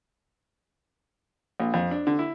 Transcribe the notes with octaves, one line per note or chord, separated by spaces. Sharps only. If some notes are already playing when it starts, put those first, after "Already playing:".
A#1
F2
D4
D3
E4